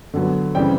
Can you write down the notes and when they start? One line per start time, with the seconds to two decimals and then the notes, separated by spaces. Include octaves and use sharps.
0.14 D3 F#3 B3
0.55 C#3 E3 G3 C4 G5